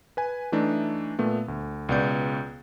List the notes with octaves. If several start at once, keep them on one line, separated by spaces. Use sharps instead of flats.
B4 G#5
E3 A3 D4 D#4
A#2 A3 B3
D2
C#2 B2 B3 D5 G6